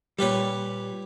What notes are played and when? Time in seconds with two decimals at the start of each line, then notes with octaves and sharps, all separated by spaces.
0.19 A#2 G3 G4 B4 C#5